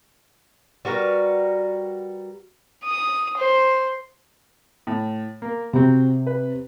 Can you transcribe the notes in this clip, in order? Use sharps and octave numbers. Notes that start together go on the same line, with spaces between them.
G3 F#4 A#4 B4
D#6
C5
A2
A#3 A#4
C3 C4 F#4 A#5
B4